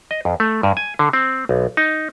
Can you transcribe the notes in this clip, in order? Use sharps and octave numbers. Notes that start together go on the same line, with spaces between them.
D#5
F2
A3
G2
G#5
D3
C4
B1
D#4